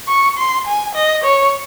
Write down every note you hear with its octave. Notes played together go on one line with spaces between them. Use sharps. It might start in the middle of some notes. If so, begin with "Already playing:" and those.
C#6
C6
G#5
D#5
C#5